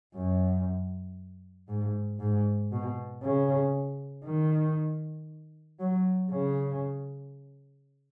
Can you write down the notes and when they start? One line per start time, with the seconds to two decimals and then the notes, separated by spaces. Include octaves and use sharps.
0.14 F#2
1.68 G#2
2.20 G#2
2.72 B2
3.23 C#3
4.25 D#3
5.79 F#3
6.31 C#3